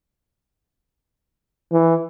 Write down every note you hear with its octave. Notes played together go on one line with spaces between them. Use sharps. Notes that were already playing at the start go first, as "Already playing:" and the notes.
E3